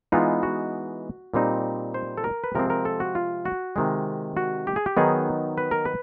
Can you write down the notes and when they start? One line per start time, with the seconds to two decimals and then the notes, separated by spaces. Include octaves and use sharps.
0.12 E3 G#3 B3 D#4 F4
0.43 F#4
1.34 A#2 G3 C4 D#4
1.94 C5
2.18 A4
2.24 A#4
2.44 B4
2.55 C3 F3 G#3 C4 A#4
2.70 A#4
2.85 A4
3.00 F#4
3.15 F4
3.45 F#4
3.76 C3 D#3 G#3
4.37 F#4
4.67 G4
4.76 G#4
4.86 G4
4.97 D#3 F#3 B3 D#4 G#4
5.58 B4
5.71 A#4
5.85 B4